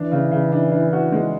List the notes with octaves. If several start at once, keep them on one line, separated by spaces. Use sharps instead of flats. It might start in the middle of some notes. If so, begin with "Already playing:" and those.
Already playing: E3 D4
C#3
C#3
D4
D4
F#4
G#3